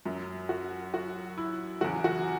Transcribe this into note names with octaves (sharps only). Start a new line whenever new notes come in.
F#2 F#3
F#4
F#4
E4
E2 C#3 F#3 F#4
F#4